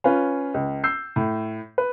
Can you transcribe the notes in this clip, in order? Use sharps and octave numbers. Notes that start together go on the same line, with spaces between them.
C#4 F4 B4
C#2
E6 G6 C7
A2
B4